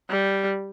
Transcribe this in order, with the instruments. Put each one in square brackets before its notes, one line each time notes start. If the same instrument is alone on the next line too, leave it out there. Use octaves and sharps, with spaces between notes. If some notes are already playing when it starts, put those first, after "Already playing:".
[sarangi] G3